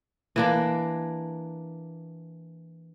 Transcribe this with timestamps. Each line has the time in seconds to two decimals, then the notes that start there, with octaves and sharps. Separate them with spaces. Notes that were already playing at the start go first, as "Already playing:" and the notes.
0.36 E3 A#3 D4